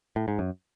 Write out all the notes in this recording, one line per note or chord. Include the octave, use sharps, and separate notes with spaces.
A2
G#2
F#2